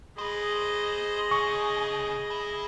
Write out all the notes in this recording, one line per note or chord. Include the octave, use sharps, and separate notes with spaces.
G#4 C5 D#5 B5
C#3 C#6
E5 B5